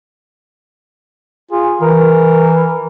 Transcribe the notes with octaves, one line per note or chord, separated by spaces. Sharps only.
F4 G#4
E3 A#4